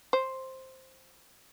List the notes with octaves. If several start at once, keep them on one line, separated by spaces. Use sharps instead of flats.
C5